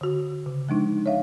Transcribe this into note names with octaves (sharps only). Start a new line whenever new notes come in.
D3 F#4
C#3
F3 G#3 D4 D#4
C#5 E5 F5